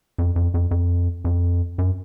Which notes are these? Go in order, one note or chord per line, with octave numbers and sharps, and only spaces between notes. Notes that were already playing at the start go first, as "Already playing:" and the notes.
F2
F2
F2
F2
F2
F#2